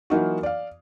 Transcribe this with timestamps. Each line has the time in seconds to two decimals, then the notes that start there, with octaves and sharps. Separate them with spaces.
0.10 E3 F#3 A#3 D#4 F4 F#4
0.43 D5 F5